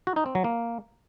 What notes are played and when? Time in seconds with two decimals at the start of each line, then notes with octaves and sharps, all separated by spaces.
0.07 F#4
0.16 D#4
0.26 C4
0.35 F#3
0.44 A#3